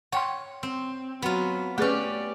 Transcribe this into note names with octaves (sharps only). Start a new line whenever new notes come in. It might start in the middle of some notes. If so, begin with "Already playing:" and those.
C#5 F#5 G5 C6
C4
F#3 B3 F4
A3 C#4 G4 G#4 B4 D5